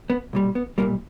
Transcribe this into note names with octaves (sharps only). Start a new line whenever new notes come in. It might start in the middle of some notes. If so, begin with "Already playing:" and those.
B3
B1 A#2 G3
B3
B1 A#2 G3 A#3